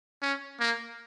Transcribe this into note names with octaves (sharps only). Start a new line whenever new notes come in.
C#4
A#3